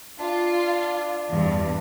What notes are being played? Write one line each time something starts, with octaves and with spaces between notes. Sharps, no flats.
D4 F4
E2 G2